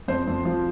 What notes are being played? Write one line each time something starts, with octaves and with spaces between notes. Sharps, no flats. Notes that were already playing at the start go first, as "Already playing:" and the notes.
F2 C5
F2
F3